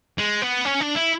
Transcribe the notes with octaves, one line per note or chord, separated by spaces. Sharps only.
G#3
B3
C#4
D4
E4